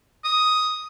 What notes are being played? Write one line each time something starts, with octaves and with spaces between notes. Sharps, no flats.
D#6